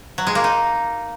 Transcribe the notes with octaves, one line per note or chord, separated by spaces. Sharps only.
F#3
G#3
A#3
D#4